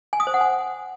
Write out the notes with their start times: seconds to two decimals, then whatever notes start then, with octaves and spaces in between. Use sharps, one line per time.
0.13 G#5
0.20 D#6
0.27 C5
0.34 F#5
0.41 G#5